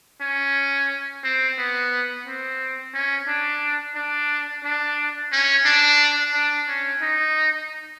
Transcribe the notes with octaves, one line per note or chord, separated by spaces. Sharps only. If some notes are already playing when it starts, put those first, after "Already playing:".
C#4
C4
B3
C4
C#4
D4
D4
D4
C#4
D4
D4
C#4
D#4